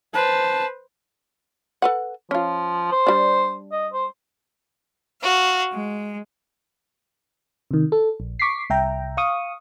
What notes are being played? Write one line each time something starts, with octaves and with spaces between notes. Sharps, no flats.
B4 C5 A5
A4 B4 F#5
F3 C#4 F4
C5
G3 D4
D#5
C5
F#4 F5
G#3
C3 D#3
A4
A#1
C#6 D6 B6 C7
C2 E5 G5 A#5
F5 C#6 D#6